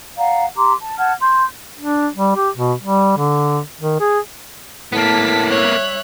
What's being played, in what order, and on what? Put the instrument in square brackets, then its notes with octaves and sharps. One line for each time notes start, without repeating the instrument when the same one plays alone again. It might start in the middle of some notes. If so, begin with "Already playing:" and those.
[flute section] D5 F5 F#5 A#5
G4 A#5 C6 D6
A5
F#5 A5 F6 G#6
C6 G6
[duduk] D4
G3
G4
B2
G3
D3
D#3
G#4
[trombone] A2 [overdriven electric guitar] A#3 B3 [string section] A5 B6
[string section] G3 E5 F#6 [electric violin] C#5